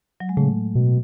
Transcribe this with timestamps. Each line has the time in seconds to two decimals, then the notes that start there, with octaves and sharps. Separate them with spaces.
0.20 F#3
0.29 G#3
0.37 A2 C#3 A3
0.75 B2